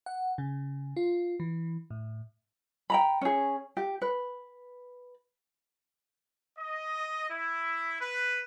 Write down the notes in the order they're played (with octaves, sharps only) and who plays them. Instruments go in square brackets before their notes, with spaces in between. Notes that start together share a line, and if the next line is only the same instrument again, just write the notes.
[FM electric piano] F#5
C#3
F4
E3
A2
[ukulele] G5 A#5 B5
C#4 G#4
G4
B4
[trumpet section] D#5
E4
B4